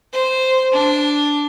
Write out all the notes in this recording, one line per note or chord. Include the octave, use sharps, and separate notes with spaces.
C5
D4